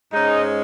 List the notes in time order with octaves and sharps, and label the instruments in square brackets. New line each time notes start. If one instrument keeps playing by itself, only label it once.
[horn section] G#2 G#3 C#4 D#4